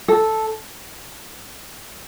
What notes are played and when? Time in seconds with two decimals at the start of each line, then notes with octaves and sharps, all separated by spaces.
0.08 A4